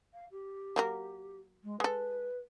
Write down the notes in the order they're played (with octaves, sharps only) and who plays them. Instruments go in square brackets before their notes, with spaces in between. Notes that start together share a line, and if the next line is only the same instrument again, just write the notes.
[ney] F5
G4
[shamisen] F#3 A#3 A#4
[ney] G#3
[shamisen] G#3 A4 [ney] B4